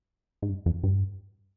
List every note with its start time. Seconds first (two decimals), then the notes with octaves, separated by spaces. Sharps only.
0.42 G#2
0.49 G2
0.66 F2
0.84 G2